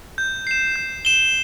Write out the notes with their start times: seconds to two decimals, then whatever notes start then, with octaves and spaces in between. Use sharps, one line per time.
0.18 G6
0.47 C7 E7
0.76 G6
1.05 E7 G7